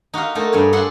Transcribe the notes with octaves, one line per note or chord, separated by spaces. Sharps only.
D#4 F#4 G4 F5
A3 A#3 D#4 A4 C5
G2 D4 G#4 C#5 D5 G5
D4 G#4 A4 F#5 A5 C6